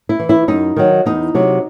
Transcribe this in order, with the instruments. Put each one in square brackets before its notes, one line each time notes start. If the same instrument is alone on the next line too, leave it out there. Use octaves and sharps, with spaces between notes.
[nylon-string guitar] E4
E3
E4
F#2 D#4
D#3 F#3
E2 D#4
C3 F#3